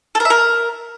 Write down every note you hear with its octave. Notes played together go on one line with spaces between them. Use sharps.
A4
A#4
E5
A#4